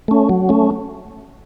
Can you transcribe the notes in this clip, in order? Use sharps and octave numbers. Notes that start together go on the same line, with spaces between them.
A3 C#4
F#3
A3 C#4